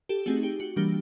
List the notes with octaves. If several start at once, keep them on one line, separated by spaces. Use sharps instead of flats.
G4 A4
A3 C4 D#4 F#4 G#4
G4
F#4
E3 G3 A#3 D4 G4